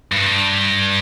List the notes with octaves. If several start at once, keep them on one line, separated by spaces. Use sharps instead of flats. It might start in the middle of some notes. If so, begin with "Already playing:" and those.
G2